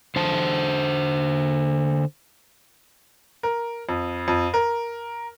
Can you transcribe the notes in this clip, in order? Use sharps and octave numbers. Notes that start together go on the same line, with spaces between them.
D3 C5 A5
A#4
F2
F2
A#4